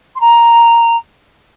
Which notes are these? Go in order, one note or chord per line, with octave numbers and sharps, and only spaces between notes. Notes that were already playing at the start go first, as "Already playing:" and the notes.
C6
A#5